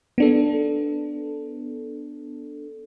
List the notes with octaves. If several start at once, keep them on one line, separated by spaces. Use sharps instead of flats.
B3 D4 A4